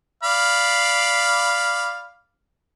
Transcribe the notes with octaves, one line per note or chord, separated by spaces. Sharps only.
D5 F5 B5